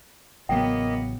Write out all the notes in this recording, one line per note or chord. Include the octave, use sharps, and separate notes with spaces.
A1 C#3 F#3 A#3 B3 D#5 G5